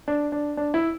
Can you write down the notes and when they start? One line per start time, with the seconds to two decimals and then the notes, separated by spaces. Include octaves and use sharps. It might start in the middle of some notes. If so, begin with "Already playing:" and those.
0.08 D4
0.32 D4
0.57 D4
0.74 E4